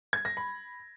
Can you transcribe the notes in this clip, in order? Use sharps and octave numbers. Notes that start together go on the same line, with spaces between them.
G#6
A#6
B5